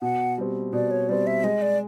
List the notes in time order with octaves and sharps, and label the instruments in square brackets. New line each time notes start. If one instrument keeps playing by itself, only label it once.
[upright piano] B2 [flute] F#5
[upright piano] G3 C4
[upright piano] B2 [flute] D5
[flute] C#5
[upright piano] G3 C4 [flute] D5
[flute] E5
[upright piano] G#3 [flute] D#5
[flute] D5